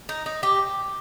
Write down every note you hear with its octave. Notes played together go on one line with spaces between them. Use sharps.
D#4
D#4
G4